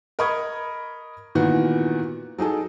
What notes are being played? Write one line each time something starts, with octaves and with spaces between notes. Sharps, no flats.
A#4 D#5 B5 C#6 D#6 G#6
A#2 D#3 E3 B3 F#4
F#3 D#4 G#4 A4